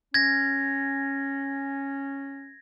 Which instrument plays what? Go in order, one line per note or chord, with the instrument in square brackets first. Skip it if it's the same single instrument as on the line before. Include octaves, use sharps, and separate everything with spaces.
[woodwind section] C#4 [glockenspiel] G#6 A#6